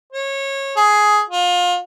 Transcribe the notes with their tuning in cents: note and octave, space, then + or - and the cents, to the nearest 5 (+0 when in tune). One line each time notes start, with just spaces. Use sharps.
C#5 -20
G#4 +10
F4 +30